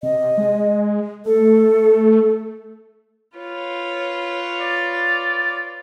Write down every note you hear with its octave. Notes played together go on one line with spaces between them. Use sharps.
C3 D#5
G#3
A3 A4
F4 B4 C#5
D5